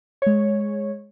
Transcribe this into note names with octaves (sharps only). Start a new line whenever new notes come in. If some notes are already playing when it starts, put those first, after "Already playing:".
G#3 C#5